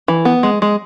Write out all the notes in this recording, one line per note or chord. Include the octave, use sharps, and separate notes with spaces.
E3
B3
G#3
G#3